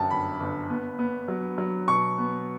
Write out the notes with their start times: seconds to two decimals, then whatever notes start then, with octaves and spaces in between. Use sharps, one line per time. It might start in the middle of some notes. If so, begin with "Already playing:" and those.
Already playing: G1 F#2 G5 A5
0.10 G1 B5
0.40 G1
0.70 B3
0.99 B3
1.28 F#3
1.58 F#3
1.88 B2 C#6
2.18 B3